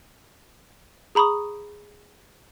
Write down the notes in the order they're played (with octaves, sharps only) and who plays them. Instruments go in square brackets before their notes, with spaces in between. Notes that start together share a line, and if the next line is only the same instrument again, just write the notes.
[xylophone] G#4 A#5 B5 C#6 D#6